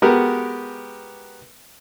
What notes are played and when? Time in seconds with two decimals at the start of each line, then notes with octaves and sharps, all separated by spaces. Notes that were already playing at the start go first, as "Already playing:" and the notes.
0.02 G#3 B3 F#4 G4 A#4